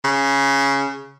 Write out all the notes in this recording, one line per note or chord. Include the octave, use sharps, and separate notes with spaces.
C#3